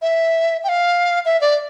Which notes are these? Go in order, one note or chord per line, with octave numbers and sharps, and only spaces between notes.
E5
G5
F5
E5
D5